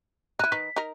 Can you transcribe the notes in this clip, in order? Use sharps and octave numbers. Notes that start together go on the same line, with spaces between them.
D#4 E4 F#6 D#7
D#3 D#4 B4 B6
D#4 A#4